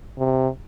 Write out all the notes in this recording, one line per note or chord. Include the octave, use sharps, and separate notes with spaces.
C3